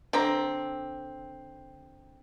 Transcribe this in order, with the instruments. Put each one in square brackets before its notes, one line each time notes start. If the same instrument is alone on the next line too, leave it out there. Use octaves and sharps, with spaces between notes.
[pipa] D3 C4 A#5